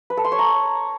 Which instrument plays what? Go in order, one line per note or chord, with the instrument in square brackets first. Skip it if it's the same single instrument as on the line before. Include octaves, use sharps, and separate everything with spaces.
[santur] B4
A4
C6
C#5
A#5